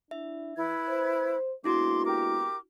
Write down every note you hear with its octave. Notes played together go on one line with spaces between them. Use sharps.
D4 E4 E5
E3 E4 B4 G#6
C5
G#3 A#3 B3 D4 E4 F#4 C6 D6
G4 A#4 D6